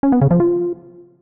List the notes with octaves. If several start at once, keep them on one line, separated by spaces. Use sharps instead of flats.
C#4
B3
C#3
F3
F4